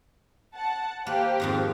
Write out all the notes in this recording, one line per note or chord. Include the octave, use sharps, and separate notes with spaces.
F#5 A5
A#3 G4 B4 C5
F2 G#2 D#3